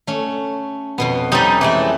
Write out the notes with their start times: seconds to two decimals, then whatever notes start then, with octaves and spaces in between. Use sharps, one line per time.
0.07 A3 C#4
0.98 F2 B2 B3
1.32 G3 C4 C#4 D#4 G4
1.61 E3 G#3 A3